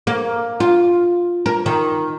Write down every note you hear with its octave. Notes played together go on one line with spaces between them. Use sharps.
A#3
F4
A#4
D#3